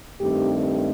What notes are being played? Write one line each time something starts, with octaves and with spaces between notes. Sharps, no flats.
G2 D#3 A3 C4 G4